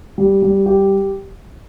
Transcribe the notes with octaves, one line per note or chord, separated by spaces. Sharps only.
G3
G3
G4